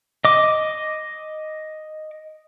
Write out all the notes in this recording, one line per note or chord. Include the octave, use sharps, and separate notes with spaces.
D#5 D6